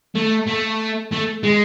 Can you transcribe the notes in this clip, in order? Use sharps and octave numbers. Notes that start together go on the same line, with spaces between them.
A3
A3
A3
G#3